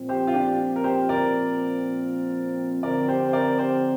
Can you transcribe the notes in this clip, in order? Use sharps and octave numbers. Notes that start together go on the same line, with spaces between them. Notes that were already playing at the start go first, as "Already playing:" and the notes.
Already playing: A#2 F3 C4
G4 C5
F4
D4 G4
A#4
G4 C5
A#4 D5
D3 F3 C4 A#4 D5
G4 C5
C5
A#4 D5
G4 C5